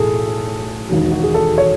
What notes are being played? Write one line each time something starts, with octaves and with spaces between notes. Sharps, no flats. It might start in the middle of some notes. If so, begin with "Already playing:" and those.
Already playing: B1 A2 E3 G#4 A4
E1 D#2 D#3 F#3
F#4
G#4
A4
C#5